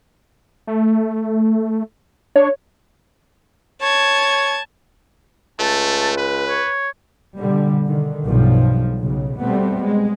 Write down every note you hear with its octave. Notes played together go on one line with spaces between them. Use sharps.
A3
D4 C#5
C#5 A5 G#6
C#2 A3 A5
B4
C#5
B2 D3 G3
D3 D#3
B1 G2 B2 F3
B1 C#3
B2 G3 A3 B3 C4
G#3